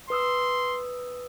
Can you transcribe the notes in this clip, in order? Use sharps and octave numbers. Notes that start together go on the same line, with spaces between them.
B4 C6 D#6 E6